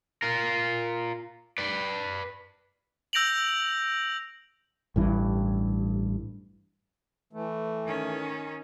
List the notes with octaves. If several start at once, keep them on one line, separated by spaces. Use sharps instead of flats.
F4 A#4
B4 D5
E6 G6 A#6 D7 F7 F#7
A1 G2 E3
E3 A3
D#3 C#4